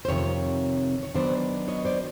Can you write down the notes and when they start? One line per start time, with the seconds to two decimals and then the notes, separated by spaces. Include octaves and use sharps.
0.05 C5
0.09 F2 C3 D#3 C#5
1.03 C#5
1.14 D#3 F#3 B3 D4 C5 D5
1.68 C#5 D#5
1.85 C5 D5